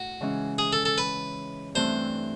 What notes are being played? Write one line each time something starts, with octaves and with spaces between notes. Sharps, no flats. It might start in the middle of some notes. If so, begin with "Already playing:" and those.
Already playing: A2 F#4
C#3 E3 G#3 C#4
G#4
A4
A4
B4
G2 E3 A3 C4 C5